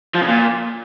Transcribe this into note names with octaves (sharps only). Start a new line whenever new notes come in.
F3
C#3
A#2